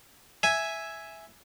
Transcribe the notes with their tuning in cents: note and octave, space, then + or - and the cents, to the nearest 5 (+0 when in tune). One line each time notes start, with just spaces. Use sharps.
E5 +0 G#5 +0